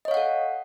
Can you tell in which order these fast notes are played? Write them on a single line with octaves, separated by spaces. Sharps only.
D#5 C#5 F5 F#5 A4